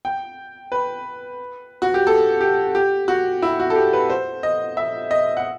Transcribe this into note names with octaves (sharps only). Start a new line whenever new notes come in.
G5
B4
F#4
G4
A4
G4
G4
F#4
E4
F#4
A4
G4
B4
C5
D#5
E5
D#5
F#5